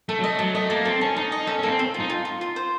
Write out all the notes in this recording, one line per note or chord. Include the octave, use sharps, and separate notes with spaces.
A3 A4
F#3
A3 D#5
F#3 A5
A3 D#5
A#3 A4
C4 A4
C#4 A5
D#4 A5
D#5
C#4 A4
A#3 C#4 A4
C4
A4
F4
D#4
F4
F4
F4
C5